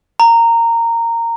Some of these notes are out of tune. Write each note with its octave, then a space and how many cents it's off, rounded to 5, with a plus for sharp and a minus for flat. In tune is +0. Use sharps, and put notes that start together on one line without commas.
A#5 -15